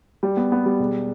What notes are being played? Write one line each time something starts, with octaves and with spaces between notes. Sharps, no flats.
G3
B3
B3
G3
E1